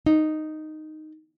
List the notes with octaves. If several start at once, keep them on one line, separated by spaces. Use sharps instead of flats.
D#4